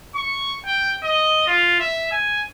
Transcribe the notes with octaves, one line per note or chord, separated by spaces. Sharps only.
C#6
G5
D#5
F4
E5
G#5